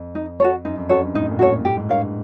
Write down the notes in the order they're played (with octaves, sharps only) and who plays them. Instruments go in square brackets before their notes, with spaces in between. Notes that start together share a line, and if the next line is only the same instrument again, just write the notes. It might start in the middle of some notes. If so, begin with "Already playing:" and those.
Already playing: [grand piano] F2
[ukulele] D#4
F#4 A4 C#5
[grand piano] F#2 [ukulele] D#4
[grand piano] F2
[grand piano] F#2 [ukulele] F#4 A4 C#5
[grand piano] G2
[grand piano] A2 [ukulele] D#4
[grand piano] A#2
[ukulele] F#4 A4 C#5
[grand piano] A2
[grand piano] A2 [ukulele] G4
[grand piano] G#2
[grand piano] G2 [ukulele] A#4 C#5 F5